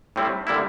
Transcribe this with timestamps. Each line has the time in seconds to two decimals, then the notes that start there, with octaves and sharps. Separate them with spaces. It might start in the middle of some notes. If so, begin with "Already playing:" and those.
0.16 A2 G3 C4 E4
0.47 D3 G3 A#3 E4